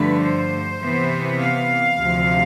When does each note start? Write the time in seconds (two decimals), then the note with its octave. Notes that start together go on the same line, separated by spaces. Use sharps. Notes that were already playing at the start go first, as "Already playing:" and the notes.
Already playing: G2 D3 F3 A3 B4
0.24 C5
0.82 C3 E3 B3
1.40 F5
1.99 D2 C3 F3